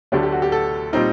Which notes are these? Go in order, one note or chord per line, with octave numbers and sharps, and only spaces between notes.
D2 D3 F#3 A3 D4 G4
G4
F#4
G4
A4
A#2 G3 C4 D#4